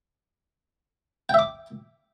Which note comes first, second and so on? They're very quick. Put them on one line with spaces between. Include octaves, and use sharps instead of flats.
G5 E5 D6